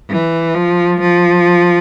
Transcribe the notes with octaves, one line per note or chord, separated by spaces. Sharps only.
E3
F3
F3